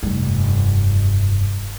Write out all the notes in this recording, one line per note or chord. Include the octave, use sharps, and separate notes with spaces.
F1 G2